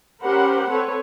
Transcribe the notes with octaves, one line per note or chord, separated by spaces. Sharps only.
C#4 G4 A#4 C5 F#5 B5
C4 A4 B4 C#5